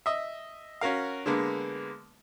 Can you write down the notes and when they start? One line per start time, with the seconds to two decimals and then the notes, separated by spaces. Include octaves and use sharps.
0.06 D#5 E5
0.81 C#4 F#4 A#4 F5
1.26 D3 G#3 A#3 B3